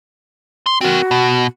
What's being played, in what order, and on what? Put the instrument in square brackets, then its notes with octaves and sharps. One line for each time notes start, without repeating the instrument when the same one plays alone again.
[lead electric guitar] C6
[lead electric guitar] C4 A#4 [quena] F#4
[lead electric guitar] B2